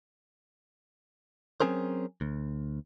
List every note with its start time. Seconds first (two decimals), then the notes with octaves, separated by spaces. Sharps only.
1.60 F#3 C4 C#4 G#4 A#4 C5
2.21 D2